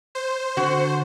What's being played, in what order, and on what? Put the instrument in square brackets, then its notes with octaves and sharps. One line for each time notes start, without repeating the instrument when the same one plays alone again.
[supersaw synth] C5
[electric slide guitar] D3 [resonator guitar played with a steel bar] F#4